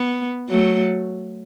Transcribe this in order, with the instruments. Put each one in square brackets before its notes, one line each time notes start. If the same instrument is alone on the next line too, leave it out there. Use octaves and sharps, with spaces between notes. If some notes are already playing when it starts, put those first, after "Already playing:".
Already playing: [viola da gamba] B3
F#3 A3